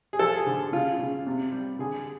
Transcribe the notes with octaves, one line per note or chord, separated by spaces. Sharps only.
G#4
F3 A4
G#4
D3
C#3 F4
C#3
C3
G3
D3 G#4